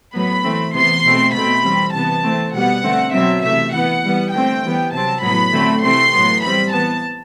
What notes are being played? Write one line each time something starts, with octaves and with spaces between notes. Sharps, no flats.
A2 F#3 B3 B5
E3 A3 C4
C3 E3 B3 C6
B2 A3 C4
B2 A3 C4 B5
E3 G3 C4
C3 E3 B3 A5
E3 A3 C4
B2 G3 B3 F#5
D3 A3 C4
B2 F#3 C4 E5
C3 E3 A3 E5
E3 B3 F#5
E3 G3 B3
D3 A3 C4 G5
E3 G3 B3
C3 F#3 C4 A5
A2 F#3 B3 B5
D3 F#3 A3 C4
C3 E3 A3 C4 C6
A2 F#3 B3
E3 G3 C4 B5
E3 B3 A5